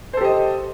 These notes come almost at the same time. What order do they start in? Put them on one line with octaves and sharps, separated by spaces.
C5 A4 G4 D#5